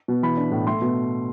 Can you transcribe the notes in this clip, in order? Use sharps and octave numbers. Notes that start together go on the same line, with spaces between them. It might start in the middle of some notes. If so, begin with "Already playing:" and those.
B2
E3 B5
D4
A2
A3 C6
B2